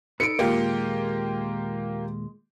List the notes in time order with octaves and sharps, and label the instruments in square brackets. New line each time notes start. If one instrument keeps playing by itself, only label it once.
[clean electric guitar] D#4 A4 B4 [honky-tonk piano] C#7 D7
[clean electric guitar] D#2 A#2 G#3 [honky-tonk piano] A#3 F4 G4